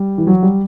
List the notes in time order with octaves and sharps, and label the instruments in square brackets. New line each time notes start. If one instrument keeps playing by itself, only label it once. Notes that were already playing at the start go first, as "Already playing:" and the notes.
Already playing: [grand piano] G3
E3
F#3
G3